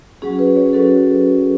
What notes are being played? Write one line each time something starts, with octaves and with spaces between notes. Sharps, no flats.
F#3 C#4 F#4 G#4
B4
C#5
F#3 C#4 F#4 A4